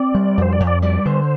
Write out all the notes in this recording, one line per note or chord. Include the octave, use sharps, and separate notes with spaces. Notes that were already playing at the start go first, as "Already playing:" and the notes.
Already playing: C4 D5
G3
F2 C5
D5
F2
D5
G3 D5
D3 C5